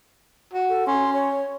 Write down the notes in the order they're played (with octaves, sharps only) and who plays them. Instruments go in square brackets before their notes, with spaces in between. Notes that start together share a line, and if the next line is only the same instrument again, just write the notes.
[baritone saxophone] F#4
[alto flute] A4
[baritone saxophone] C#4 [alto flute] C6
[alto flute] C#5